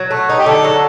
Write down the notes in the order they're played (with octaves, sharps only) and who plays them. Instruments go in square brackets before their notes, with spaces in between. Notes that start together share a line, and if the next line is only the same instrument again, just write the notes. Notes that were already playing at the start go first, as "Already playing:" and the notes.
Already playing: [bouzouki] F#3
A3
D#4
[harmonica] G4
[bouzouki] D3 [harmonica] A4
[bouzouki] F#3